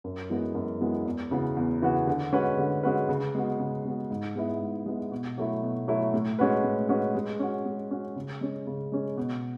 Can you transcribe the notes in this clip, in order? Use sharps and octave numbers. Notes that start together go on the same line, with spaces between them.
F#2
E3 G#3 B3 F#4
F#2
E3 G#3 B3 F#4
E2
C#3 E3 B3 F#4
E2
C#3 E3 B3 F#4
D3
G#3 C#4 F#4 B4
D3
G#3 C#4 F#4 B4
C#3
G#3 B3 F#4
C#3
G#3 B3 F#4
G#2
G#3 B3 E4
G#2
G#3 B3 E4
B2
F#3 A3 E4
B2
F#3 A3 E4
A2
G#3 C#4 F#4 B4
A2
G#3 C#4 F#4 B4
G#3
C#4 F#4
G#3
C#4 F#4
C#3
G#3 C#4
C#3
G#3 C#4
B2